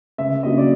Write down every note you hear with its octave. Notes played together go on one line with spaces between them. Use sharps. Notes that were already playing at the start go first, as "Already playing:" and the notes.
C#2 E5
C#3 F#3 A#3 D4 D#5
D5